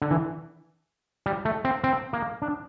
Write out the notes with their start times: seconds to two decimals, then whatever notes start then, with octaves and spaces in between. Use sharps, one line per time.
0.02 D3
0.11 E3
1.26 G3
1.45 A3
1.65 C4
1.84 C4
2.13 A#3
2.42 D4